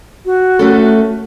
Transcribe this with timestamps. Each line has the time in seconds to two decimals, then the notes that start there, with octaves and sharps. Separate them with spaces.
0.26 F#4
0.59 A3 C#4 A4